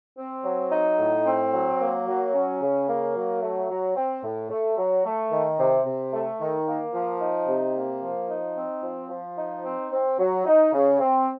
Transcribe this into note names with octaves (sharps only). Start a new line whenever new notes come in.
C4
F#3
D#4
A2
C4
F#3
A#3
F#3
C#4
C#3
A#3
F#3
A3
F#3
C4
A2
A3
F#3
A3
D#3
C3
C3
A3
D#3
A#3
F3
D#4
C3
A#3
F3
D#4
C4
F3
F3
D#4
C4
C4
F#3
D#4
C#3
C4